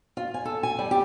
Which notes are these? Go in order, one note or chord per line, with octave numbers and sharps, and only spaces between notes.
F4
G#5
A4
G#5
G3
G4